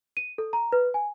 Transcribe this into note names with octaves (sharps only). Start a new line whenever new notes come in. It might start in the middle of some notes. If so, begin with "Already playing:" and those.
D#7
A4
A#5
B4
G#5